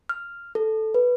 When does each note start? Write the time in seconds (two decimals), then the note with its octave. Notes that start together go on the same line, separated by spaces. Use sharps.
0.09 F6
0.55 A4
0.94 B4